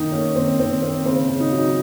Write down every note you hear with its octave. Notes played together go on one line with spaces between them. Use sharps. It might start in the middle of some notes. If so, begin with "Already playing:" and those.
Already playing: D#3 A#3 D#4
A#3 C#4
D#3 C4
D#3 C4
A#3 C4
C#3 C4
C#3
D#4
F#3
D#4